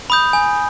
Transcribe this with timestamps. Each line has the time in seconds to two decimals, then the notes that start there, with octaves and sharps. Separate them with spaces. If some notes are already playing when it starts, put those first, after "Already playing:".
0.10 B5 D#6 G6
0.33 G#5